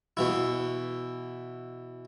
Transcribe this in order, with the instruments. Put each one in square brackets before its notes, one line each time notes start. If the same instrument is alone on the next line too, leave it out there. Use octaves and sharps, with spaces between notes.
[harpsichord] B2 E3 E4